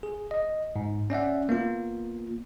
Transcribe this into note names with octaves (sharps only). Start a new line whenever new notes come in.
G#4
D#5
G#2
C#4 D5 E5 F#5
A#3 B3 F4